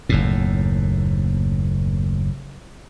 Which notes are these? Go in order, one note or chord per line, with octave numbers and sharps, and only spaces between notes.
F#1 D#2 A2